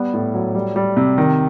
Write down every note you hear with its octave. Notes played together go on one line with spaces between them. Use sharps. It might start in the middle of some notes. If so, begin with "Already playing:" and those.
Already playing: G3 B3
A2
F#3
G3
G3
C3
D#3